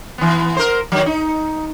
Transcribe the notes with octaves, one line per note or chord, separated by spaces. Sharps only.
E3 B3
A#4 C5
D#3 F#3
D#4